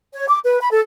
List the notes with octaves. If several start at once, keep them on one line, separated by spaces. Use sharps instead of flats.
C#5
D6
B4
B5
A4